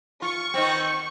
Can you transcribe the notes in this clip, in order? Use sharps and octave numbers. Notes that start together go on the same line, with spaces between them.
F4 C#6
D#3 B3 C4